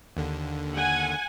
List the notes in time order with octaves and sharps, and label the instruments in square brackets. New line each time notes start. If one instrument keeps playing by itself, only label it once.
[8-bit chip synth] D#2 D3
[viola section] F#5 G#5